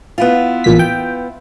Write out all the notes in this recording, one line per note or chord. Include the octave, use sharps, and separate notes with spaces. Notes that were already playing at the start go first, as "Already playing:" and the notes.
B3 E4 F4
A1 A#2 B6
G5